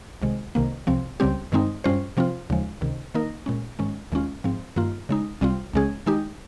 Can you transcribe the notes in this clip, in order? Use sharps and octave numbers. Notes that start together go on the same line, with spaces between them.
C2 C3 D#3 G#3
C2 C3 D#3 A#3
C2 C3 F3 C4
C#2 C#3 G3 C4 G4
G2 D#3 G#3 C4 D#4
G2 G3 C#4 F4 C5
C3 F3 C4 F4
D#2 C#3 F3 G#3
C#2 C3 D#3
D#3 A#3 D#4 A#4
A#2 G#3 C#4
G#2 D#3 G#3 C#4
D#2 D#3 G#3 C#4 F4
G#2 F3 C4
G2 D#3 A#3 F4
C#3 G#3 D#4
C2 C3 G3 C4 F4
C#2 C#3 G#3 C#4 G#4
D#3 G#3 D#4 G4